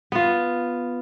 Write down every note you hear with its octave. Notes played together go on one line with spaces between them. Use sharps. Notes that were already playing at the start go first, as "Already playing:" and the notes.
B3 F4